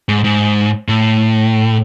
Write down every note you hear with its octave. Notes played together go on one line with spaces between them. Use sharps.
G#2
G#2
A2